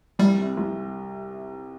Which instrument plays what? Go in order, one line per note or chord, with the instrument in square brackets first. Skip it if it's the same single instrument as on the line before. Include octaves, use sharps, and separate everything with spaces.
[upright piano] C2 [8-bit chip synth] G3
[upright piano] C3
C2